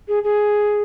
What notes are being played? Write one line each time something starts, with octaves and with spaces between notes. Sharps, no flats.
G#4
G#4